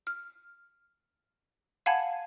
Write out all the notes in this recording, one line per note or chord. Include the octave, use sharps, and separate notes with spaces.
F6
F5 F#5 G#5 A5 B5 G#6